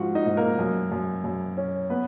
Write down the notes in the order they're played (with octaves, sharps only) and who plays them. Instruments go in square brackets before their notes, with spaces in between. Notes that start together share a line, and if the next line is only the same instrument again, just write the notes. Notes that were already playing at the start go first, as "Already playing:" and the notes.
Already playing: [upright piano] G#2 F3 F4 F#4 F#5
D#4 D#5
G#2
A#3 A#4
F#2
F#2
F#2
C#4
B3 B4